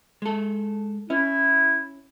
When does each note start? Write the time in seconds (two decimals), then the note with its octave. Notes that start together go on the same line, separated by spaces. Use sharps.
0.22 G#3 A4
1.10 C#4 E4